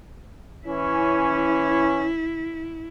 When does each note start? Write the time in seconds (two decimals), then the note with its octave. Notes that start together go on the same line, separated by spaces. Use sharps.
0.67 E3 C#4 E4